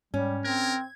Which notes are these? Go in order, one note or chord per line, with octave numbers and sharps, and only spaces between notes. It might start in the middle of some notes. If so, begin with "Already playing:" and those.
G#2 G3 C#4
C4 A#4 G#6